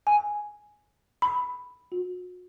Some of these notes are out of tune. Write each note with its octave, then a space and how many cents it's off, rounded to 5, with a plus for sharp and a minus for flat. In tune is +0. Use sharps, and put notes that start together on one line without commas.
G#5 +5
B5 +5
F#4 -40